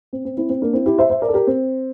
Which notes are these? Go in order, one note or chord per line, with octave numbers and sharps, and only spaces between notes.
C4
C4
C4 E4
C4
A#3 D4
C4 E4
E4 G4
C5 E5
C5 E5
A#4 D5
A4
G4 A#4
C4